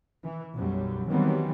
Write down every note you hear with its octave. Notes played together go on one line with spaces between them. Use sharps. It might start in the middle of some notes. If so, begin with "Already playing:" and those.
E3
B1 F#2 F#3 G3
D#3 E3 F#3 G3 B3 C4